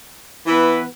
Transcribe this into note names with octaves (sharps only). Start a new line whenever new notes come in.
E3 B3 E4 B4